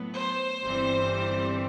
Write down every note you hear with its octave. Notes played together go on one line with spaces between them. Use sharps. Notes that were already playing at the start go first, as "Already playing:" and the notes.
Already playing: A2 F#3 B3
C5
G1 G2 E3 G3 C4